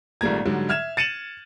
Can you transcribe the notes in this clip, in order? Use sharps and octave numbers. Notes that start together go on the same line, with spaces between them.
G#1 A#2 G3 A3 A#5 G#6
G#2 D3 F#3 G3
E5 F6 G#6 E7
A6 C#7 D#7 E7 F#7